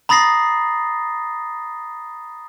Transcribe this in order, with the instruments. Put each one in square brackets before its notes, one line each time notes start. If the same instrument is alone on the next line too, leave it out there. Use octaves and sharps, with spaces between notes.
[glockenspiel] A#5 B5 D#6 A6 A#6 C7